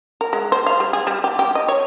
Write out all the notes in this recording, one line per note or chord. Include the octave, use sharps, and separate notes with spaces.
A#4
G#3
C5
F5
G3
G#4
G3
G4
G4
D#5
C#5